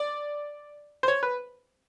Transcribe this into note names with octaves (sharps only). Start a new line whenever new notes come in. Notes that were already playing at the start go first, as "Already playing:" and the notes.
Already playing: D5
C5
C#5
B4